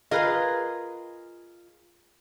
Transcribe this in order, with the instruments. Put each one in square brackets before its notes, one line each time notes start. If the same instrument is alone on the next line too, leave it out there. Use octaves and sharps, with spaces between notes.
[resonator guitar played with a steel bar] F4 G#4 D#5 [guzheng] A#4 B4 F5